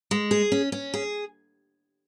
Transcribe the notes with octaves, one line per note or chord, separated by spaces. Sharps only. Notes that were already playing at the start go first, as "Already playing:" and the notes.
G#3
G#4
C#4
C#4
G#4